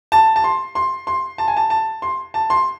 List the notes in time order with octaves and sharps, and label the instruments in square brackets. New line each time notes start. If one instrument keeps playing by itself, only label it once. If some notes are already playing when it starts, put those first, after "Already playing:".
[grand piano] A5
A5
C6
C6
C6
A5
G#5
A5
A5
C6
A5
C6